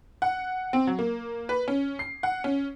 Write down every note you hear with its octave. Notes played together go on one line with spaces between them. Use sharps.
F#5
C4
F#3
A#3
B4
C#4
C7
F#5
C#4